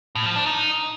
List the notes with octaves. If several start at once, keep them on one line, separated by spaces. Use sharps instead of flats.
A2
F3
D4
D#4